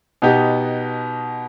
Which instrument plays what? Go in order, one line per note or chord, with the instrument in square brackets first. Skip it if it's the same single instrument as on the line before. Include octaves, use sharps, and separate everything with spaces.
[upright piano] B2 B3 D#4 G4